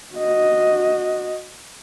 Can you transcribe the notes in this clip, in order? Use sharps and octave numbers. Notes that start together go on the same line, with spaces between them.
F#4 D#5